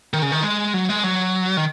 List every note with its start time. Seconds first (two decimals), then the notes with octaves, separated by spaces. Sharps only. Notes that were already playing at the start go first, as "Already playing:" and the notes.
0.13 D#3
0.22 C#3
0.32 D#3
0.43 G#3
0.74 F#3
0.89 G#3
1.04 F#3
1.57 D#3